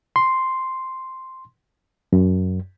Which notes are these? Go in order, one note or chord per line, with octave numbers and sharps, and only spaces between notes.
C6
F#2